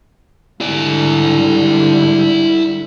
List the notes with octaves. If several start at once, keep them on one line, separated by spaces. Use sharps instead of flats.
G#2 D3 G3 E4 D5